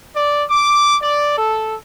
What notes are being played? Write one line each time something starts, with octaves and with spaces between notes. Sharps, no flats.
D5
D6
D5
A4